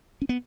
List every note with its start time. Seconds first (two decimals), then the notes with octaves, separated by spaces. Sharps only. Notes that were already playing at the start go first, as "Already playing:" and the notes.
0.22 C#4
0.29 B3